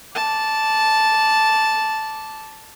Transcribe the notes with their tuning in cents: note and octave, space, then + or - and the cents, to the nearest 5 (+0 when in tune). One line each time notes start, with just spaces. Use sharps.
D5 -10 A5 -5